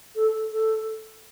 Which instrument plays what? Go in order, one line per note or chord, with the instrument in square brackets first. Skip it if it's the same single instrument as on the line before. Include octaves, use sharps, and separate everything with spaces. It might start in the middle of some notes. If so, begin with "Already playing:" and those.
[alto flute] A4
A4